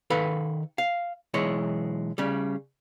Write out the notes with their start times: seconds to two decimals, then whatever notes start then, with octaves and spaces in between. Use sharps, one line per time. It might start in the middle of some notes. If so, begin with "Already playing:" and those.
0.10 D#3 A4 B4 F5 B5
0.78 F5
1.34 B1 E3 G#3 C#5
2.18 C#3 G3